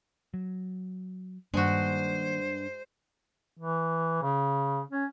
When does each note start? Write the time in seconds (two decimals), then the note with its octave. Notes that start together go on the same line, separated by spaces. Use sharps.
0.34 F#3
1.54 G2 D#3 G#3 A#3 D4 F#4 C5
3.58 E3
4.22 C#3
4.91 C#4